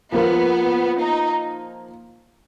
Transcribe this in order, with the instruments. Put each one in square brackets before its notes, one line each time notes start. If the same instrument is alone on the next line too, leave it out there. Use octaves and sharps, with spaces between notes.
[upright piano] F3 A#3 F4 [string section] B3
[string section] D#4